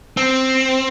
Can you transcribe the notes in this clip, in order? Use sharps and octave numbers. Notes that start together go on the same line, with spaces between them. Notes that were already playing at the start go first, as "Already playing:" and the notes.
C4